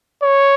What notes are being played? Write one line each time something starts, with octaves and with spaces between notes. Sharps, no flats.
C#5